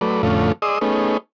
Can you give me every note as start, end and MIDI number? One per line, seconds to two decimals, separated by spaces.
0.01 0.22 54
0.01 0.22 57
0.01 0.22 71
0.01 0.22 74
0.23 0.52 41
0.23 0.52 45
0.23 0.52 50
0.23 0.52 57
0.23 0.52 61
0.23 0.52 65
0.62 0.79 68
0.62 0.79 74
0.62 0.79 75
0.62 0.79 84
0.62 0.79 87
0.62 0.79 88
0.81 1.17 57
0.81 1.17 59
0.81 1.17 61
0.81 1.17 63
0.81 1.17 68